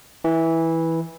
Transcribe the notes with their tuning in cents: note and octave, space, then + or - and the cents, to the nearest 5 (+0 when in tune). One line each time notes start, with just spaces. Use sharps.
E3 -10